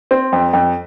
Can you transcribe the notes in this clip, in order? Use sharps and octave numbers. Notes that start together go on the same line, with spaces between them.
C4
F2
F2